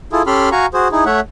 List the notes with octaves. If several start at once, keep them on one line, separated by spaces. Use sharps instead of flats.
E4 F4 G#4 A4
C#4 G4 A4 B5 C6 F6
F#4 F5 G#5 A#5 C#6
F#4 G#4 C5
D#4 E4 G#4
A3 C#5 E5 F#5